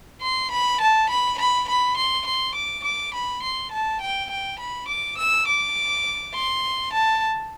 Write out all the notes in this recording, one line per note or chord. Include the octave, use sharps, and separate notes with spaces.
C6
B5
A5
B5
B5
B5
C6
C6
D6
D6
B5
C6
A5
G5
G5
B5
D6
E6
D6
C6
A5